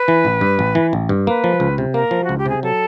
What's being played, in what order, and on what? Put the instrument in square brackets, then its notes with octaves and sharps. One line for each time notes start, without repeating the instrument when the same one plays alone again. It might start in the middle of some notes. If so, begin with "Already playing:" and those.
Already playing: [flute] B4
[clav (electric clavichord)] E3
A1
G2
A1
E3
A1
G2
[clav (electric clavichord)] A#3 [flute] B4
[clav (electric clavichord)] F3
C#2
C3
[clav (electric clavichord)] A#3 [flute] A#4
[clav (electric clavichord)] F3
[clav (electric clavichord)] C#2 [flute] F#4
[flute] G4
[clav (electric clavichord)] C3 [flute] G#4
[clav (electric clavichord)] F#3 [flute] A4